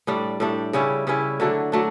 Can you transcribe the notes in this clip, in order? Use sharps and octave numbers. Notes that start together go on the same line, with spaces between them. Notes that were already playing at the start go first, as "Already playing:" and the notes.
A2 G3 D4
A2 G3 D4
C#3 G3 C#4 E4
C#3 G3 C#4 E4
D3 F#3 A3 D4
F#3 A3 D4